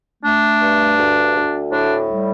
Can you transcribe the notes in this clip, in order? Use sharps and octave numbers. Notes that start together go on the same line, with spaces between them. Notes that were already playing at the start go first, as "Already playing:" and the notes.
A3 D4
G2
D2
D2
A2 D4
G3